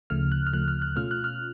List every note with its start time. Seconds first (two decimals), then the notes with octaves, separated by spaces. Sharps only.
0.10 D2 C#3 F3 A3 F6
0.32 F#6
0.47 F6
0.53 D2 C#3 F3 A3 F#6
0.68 F6
0.82 F#6
0.96 B2 A3 C#4 F4 F6
1.11 F#6
1.24 F6